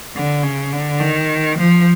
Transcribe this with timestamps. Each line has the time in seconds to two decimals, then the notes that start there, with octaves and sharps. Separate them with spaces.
0.15 D3
0.43 C#3
0.72 D3
1.00 D#3
1.58 F3